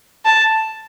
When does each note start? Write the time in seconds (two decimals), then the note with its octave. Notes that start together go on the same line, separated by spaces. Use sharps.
0.25 A5